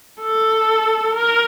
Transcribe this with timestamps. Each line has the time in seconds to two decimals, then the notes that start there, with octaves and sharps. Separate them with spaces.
0.21 A4
1.15 A#4